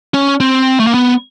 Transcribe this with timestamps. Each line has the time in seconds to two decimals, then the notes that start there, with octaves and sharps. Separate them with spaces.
0.14 C#4
0.40 C4
0.80 A3
0.87 A#3
0.94 B3